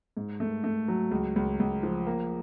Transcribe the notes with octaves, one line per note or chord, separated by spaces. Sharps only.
G#2
A3
A3
F#3
C#2
C#2
C#2
F3
A#3